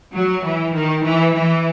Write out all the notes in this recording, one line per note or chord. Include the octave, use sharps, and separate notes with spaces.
F#3
E3
D#3
E3
E3